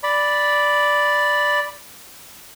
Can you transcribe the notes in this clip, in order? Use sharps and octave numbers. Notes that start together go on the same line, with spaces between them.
D5 B5